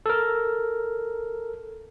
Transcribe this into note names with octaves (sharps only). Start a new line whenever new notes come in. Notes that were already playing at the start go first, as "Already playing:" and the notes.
A4 A#4